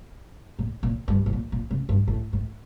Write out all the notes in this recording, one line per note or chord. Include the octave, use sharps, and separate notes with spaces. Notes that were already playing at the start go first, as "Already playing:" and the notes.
A#2
A#2
G2
A2
A#2
A#2
C#3
G2
A2
A2